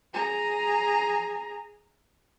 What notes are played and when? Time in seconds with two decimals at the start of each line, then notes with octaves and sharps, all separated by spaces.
0.14 G#4 A#5